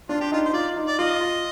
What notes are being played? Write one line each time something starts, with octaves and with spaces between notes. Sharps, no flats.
D4 F4
G4
D#4 F4
C5
F4 D5
D#4
D5
F4 D#5
F4